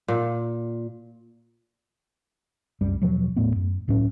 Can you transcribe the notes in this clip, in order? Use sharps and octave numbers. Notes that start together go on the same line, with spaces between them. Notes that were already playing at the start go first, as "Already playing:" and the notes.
A#2
C2 F#2 G3
E2 B2 F3 F#3
D#1 A2 A3 B3
F#2
C#2 A2 F#3 C#4